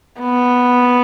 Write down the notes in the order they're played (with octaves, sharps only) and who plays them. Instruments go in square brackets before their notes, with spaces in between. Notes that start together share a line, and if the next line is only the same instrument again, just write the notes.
[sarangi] B3